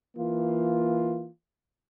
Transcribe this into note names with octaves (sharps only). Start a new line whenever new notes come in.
E3 A#3 F4